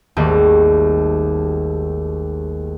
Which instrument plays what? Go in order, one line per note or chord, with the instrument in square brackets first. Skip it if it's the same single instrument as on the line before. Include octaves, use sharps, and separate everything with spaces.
[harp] G#1 D#2 D#3 G3 A3